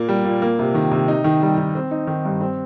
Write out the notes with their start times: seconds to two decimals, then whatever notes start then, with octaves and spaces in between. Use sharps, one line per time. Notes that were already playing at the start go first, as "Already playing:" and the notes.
Already playing: A#2 A#3
0.09 G3
0.25 A#2
0.42 A#3
0.59 C3
0.74 D#3
0.91 C3
1.08 D#4
1.24 D#3
1.42 G3
1.58 D#3
1.75 C4
1.91 D#4
2.07 D#3
2.25 G2
2.41 C4